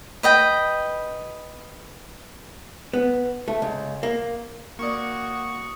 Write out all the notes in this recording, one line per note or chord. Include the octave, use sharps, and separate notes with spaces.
B4 D#5 G5
B3
A3
C#2
A#3
A#3 F#4 D5 C#6 D#6 C#7